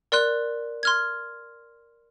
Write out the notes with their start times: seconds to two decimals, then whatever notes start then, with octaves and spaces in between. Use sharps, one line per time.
0.12 A#4 D5 C6 F#6
0.83 C6 F6 G#6